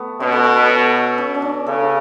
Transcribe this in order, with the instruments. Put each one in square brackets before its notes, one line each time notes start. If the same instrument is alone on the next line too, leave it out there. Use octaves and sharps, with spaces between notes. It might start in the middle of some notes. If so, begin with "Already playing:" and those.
Already playing: [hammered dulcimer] A3 B3
[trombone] B2 [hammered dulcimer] C#4
[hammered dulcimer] A4
B4
A4
F#4
C#4
C#4
D4
[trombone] C#3 [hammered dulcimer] A4